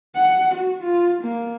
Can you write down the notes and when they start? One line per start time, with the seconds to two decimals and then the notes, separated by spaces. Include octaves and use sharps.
0.15 F#5
0.54 F#4
0.83 F4
1.21 A#3